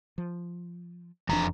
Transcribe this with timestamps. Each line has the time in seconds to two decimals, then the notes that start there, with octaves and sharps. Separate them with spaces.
0.18 F3
1.29 E1 F2 E3 D4 A#5